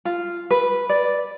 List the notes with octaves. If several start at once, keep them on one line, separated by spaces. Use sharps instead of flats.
F4
B4
D5